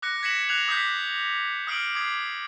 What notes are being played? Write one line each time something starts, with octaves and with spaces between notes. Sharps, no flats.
D6 F#6 A#6 C#7
G#6 A#6 B6 C#7 E7 F#7
F#6 G#6 C7 F7 F#7
D6 D#6 F#6 G6 B6
D#6 F6 C7 D7 F#7
D6 D#6 G#6 C7 F#7